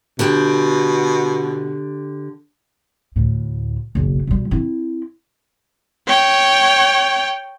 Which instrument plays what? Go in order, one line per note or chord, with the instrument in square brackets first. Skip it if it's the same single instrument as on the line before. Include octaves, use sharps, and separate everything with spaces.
[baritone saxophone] B2 [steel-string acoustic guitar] D3 G4 G5
[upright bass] D2 A2
F#1 B1
B2 G3
C4 E4
[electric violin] C#5 G5